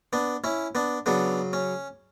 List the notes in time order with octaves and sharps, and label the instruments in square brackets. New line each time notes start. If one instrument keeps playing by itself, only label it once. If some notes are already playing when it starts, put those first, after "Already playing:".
[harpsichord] B3 D4
C#4 E4
B3 D4
C#3 F#3 B3 D4
C#4